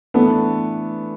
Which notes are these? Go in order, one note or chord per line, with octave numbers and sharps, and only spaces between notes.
E3 A3 B3 D4 A4